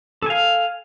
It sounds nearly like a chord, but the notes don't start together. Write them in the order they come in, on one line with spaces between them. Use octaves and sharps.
A4 G#5 F5